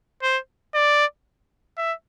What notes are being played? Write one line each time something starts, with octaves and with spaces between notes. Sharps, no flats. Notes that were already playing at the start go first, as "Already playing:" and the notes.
C5
D5
E5